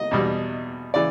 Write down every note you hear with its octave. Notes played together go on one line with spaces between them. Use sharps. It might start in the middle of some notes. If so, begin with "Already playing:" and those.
Already playing: D#5
E2 B2 G3
C#3 E3 D5